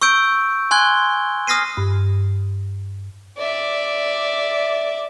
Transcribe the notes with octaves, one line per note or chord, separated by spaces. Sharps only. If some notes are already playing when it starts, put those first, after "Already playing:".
C#6 E6 G6 D7
G#5 C6 F#6 G#6 G7
D#6 F6 A#6 C7 D#7
G2
D5 E5